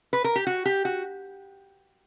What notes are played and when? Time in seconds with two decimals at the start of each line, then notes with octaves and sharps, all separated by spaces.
0.13 B4
0.24 A#4
0.36 G4
0.47 F#4
0.65 G4
0.85 F#4